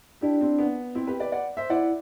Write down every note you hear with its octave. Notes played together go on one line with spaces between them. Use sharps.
D4 E4 G4
C4 E4
B3
C4 E4
G4 B4
B4 D5
D5 F#5
C5 E5
E4 D5 F#5